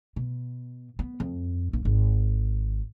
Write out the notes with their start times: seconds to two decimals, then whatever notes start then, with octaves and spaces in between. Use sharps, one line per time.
0.16 B2
0.99 B3
1.20 F2
1.73 A#1
1.85 G#1